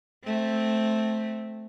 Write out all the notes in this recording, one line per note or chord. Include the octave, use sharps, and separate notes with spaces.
A3 C4